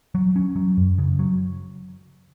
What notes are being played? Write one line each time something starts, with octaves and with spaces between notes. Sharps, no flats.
F#3
C#4
F#3
F#2
C#3
F#3